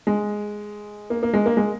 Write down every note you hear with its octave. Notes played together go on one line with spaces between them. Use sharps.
G#3
A#3
A#3
G#3
A#3
G#3